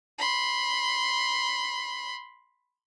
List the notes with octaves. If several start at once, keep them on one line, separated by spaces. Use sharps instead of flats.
B5 C6